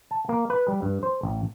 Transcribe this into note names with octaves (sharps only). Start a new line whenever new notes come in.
A5
A#3
B4
G3
G2
C5
A1